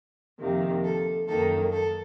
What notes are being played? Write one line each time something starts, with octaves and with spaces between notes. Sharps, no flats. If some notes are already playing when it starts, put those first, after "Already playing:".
F2 C3 D#3 A#3
A4
F#2 D#3 A#3 A4
A4